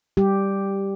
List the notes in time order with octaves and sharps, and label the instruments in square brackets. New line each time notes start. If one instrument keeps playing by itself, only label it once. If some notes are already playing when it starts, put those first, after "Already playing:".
[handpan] G3 G4